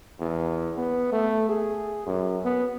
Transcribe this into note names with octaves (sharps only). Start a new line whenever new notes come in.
E2
B3
A3
G#4
F#2
B3